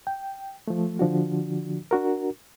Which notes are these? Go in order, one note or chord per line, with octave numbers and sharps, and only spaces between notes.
G5
F3 A3
D3 F3 D4 F#4
D4 F#4 A#4